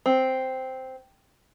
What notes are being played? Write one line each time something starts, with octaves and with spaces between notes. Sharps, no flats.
C4